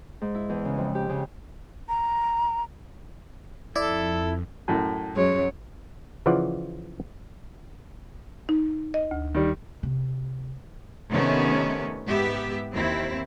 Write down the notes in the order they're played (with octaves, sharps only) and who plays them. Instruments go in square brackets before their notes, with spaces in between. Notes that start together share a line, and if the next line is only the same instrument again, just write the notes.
[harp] G#2
E4
E2
C#3
F2
G4
C#3
[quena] A#5
[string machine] F2 [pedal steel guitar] E4 [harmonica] A4 [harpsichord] D5
[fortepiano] F#2 A2
[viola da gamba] F#2 F#3 C#5 [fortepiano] G#3
[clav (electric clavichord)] C#3 E3 F3 F4 D5 F#5
[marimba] D#4
D#5
D2
[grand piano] D#3 G3
[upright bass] C3
[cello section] C3 D#3 A3 B3 C#4
G#2 B3 G4 E5
D#2 C4 E4